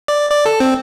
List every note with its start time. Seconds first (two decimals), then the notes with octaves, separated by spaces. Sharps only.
0.08 D5
0.31 D5
0.46 A4
0.60 C4